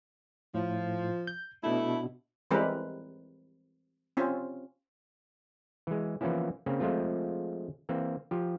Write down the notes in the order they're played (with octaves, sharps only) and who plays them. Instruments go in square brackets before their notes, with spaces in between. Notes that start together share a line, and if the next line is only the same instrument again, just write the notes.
[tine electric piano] A2 [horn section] F3
[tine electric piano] G6
[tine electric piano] B2 D4 [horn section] A3 E4
[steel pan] E3 G3 G#3 C4 A#4 B4
C4 C#4 F4
[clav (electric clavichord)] E3 G#3
E3 F3 A#3 B3 C#4 E4
C#3 A#3 C4 C#4
F3 G#3 A3 C4 F4
E3 A#3 C4
F3 G4